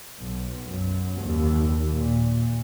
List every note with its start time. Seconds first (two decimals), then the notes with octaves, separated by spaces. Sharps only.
0.20 B1
0.70 F#2
1.22 D#2
1.89 A#2